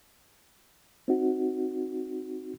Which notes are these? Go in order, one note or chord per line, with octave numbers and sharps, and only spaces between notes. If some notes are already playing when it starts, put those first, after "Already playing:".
C4 D#4 F#4